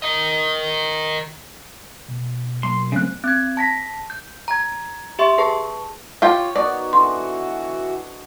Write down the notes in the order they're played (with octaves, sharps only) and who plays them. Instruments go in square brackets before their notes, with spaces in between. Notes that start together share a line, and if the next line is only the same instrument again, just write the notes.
[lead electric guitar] A#4 D#5
[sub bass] B2
[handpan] F#3 A#3 [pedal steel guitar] C6
[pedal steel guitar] C#3 F#6 [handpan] F#3 A3 C4
[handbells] C4 G#6
A5 A#6 B6
G6
A#5 G#6
G4 E5 C6 C#6
G#4 B4 A5 C#6
[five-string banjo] F4 G4 G5 [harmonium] C#5
[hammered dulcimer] B3 D#4 F#4 [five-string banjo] D5
[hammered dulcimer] D3 [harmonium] E3 F#4 [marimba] C6